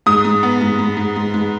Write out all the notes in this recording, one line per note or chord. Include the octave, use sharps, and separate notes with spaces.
G#2 D#6
G#2
B3
G#2
G#2
G#2
G#2
G#2